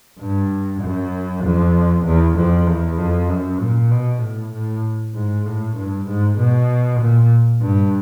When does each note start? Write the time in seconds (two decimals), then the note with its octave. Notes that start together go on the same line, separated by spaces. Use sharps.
0.20 G2
0.82 F#2
1.44 F2
2.05 E2
2.37 F2
2.67 E2
2.98 F2
3.29 F#2
3.60 A#2
3.91 B2
4.22 A2
4.53 A2
5.15 G#2
5.46 A2
5.77 G2
6.08 G#2
6.39 B2
7.00 A#2
7.62 G2